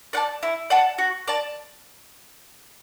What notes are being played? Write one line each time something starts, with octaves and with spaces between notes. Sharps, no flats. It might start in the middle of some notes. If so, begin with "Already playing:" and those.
D5 F#5 A5
E4
D5 F#5 A5
F#4
D5 A5